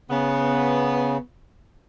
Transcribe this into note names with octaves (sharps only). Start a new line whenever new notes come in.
C#3 B3